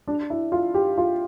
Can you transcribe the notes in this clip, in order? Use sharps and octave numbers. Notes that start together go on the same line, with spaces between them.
D4
E4
F4
G4
F4